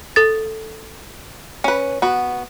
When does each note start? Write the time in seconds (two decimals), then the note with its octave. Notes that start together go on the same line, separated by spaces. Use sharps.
0.16 A4 A6
1.64 C#4 B4
2.02 B3 F#4